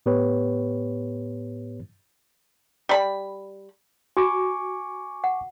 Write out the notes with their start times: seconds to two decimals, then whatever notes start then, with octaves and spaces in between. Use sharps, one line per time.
0.06 A2 B3 G4 B4 C#5
2.89 G3 B5
4.17 F#4 G#5 C#6 D6
5.24 F#5